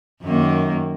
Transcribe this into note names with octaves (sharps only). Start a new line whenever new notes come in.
F#2 D#3 A#3